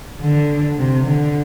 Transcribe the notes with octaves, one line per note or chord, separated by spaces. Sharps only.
D3
C3
D3